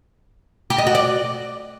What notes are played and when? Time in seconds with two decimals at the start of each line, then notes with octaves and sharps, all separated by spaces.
0.70 G4
0.78 D#5
0.87 F#4
0.95 D5